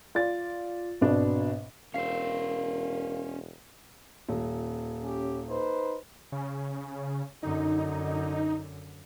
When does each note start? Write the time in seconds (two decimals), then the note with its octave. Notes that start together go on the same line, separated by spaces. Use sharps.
0.15 F4 D5 A6
1.01 G#1 B2 D4
1.94 E1 C#4 A#4 C5 F5 C7
4.29 D#1
5.03 C#4 G4
5.49 D#4 B4 C5
6.32 C#3
7.43 F#2 D3 D#4